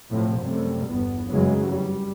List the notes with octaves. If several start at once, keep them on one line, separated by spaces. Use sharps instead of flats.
A2 C3 F3
F#2 C3 G3 A3
G1 E2 B3
F1 F#2 C#3 E3 F#3 G#3
G3